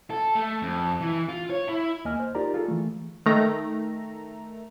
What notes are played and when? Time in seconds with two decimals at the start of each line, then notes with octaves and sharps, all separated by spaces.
0.10 A4
0.35 A3
0.62 F2
1.01 E3
1.29 F4
1.50 C#5
1.68 E4
2.05 D#2 A#3 D#5 G#5 F6
2.20 C5
2.35 D#4 F4 G4 A#4 D5 A#5
2.54 F4 G#4 A4
2.68 E3 A3
3.26 D#3 A3 A#5